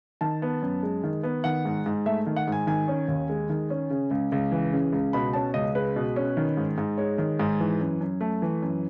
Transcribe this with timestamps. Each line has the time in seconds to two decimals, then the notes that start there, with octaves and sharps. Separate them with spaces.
0.21 D#3 A5
0.42 B3
0.62 F#2
0.83 G#3
1.04 D#3
1.23 B3
1.44 D#3 F#5
1.65 G#2
1.86 G#2
2.06 A3 E5
2.26 D#3
2.36 F#5
2.48 G#2 G#5
2.67 D#3 G#5
2.88 C#4
3.08 D#2
3.29 G#3
3.50 D#3
3.70 C#4
3.90 C#3
4.11 C#2
4.32 C#2
4.52 E3
4.73 C#3
4.92 C#2
5.13 B2 B5
5.33 C#4 A5
5.54 C#2 D#5
5.75 G#3 B4
5.96 B2
6.16 C#4
6.37 D#3
6.57 G#2
6.78 G#2
6.97 G#3 C#5
7.18 D#3
7.40 G#2
7.60 E3
7.81 F#2
8.01 F#2
8.21 A3
8.42 E3
8.62 F#2